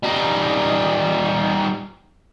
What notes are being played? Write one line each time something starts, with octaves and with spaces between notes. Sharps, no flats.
G3 D#4